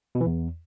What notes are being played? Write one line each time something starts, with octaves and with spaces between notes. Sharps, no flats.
B2
E3
E2